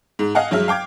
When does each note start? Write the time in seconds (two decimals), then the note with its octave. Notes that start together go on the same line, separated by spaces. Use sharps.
0.19 G#2
0.35 D#5 F5 F#5 G#5
0.51 G2 F#3 G#3 E5 F6
0.68 F5 G5 D6 G#6